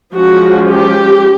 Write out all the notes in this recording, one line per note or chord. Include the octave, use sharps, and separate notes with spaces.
F3 G#3 C#4 F#4
G4